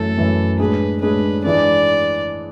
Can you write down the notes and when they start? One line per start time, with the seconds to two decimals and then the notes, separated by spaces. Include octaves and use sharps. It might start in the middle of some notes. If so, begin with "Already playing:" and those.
Already playing: F#2 E3 A3 A4
0.17 F#2 E3 A3
0.59 A2 G#3 D4 G#4 B4
1.01 A2 G#3 D4 G#4 B4
1.44 G#2 E3 G#3 D4 D5